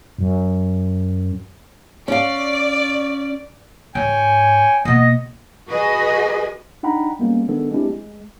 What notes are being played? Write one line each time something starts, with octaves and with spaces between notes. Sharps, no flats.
F#2
C#4 D5 F5
G#2 C#5 G5 G#5
B2 A#3 B3 D#5
F#4 G#4 B4 D#5
D4 D#4 F#5 G5 A#5 B5
G3 G#3 A#3 B3 C#4
D#3 G#3 B3 D4 A4
G#3 A3 C4 D4 E4 G4
G#3